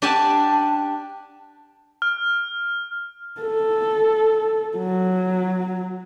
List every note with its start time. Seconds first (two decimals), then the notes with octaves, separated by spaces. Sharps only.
0.02 D4 G4 D5 F#5 G#5 A5
2.02 F6
3.41 A4
4.77 F#3